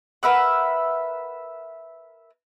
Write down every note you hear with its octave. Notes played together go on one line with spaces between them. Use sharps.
A#4 B4 E5 F#5